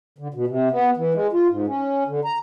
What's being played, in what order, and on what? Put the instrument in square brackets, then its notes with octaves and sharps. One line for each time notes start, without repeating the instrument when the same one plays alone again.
[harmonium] D3
B2
C3
B3
E3
G#3
F4
G#2
C#4
D3
A#5